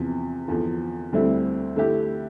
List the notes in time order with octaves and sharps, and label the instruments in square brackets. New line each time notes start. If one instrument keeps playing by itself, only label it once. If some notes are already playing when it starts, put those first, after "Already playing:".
Already playing: [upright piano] E2 C3 F3
E2 D3 F3
D2 D3 G3 C4 E4
D3 A3 E4 G4